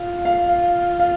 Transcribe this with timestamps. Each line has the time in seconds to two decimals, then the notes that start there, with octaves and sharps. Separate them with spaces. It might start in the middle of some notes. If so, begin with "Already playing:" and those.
Already playing: F4
0.25 F5
1.00 F5